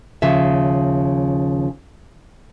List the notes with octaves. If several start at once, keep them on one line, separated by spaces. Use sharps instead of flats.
D#2 C#3 F3 E5